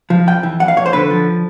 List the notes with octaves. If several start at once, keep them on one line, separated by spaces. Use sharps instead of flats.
F3
F2 G5
E3
F2 F#5
F5
F2 C#5
C5
D3 B4
F3